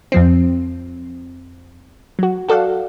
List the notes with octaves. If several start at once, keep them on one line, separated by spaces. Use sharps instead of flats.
F2 F3 C4
F#3 F#4
F#4 A4 D5 F5 F#5